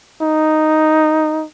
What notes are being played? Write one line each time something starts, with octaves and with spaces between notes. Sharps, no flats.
D#4